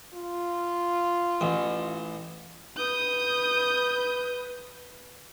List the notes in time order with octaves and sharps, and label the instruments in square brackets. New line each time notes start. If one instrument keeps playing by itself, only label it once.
[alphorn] F4
[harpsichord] A1
[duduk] B4 [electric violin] D#6 G6